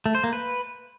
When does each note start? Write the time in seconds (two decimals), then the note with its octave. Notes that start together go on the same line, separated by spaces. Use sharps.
0.06 A3
0.15 C5
0.24 A#3
0.33 B4